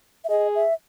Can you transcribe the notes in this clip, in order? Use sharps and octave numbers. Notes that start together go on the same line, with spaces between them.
E5
G#4 D#5
E5